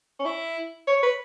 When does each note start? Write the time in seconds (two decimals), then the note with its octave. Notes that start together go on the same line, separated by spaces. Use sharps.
0.20 C#4
0.26 E4
0.88 C#5
1.03 B4